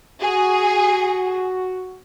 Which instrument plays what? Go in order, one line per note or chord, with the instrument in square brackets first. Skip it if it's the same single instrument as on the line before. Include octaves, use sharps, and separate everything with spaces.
[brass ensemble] F#4 [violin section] G#4